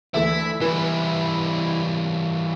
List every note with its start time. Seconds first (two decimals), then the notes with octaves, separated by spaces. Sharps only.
0.14 D2 E3 A3 E4 E5
0.61 E3 G3 E4 B4